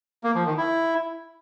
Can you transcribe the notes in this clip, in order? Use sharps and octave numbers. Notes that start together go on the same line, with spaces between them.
A#3
F3
D#3
E4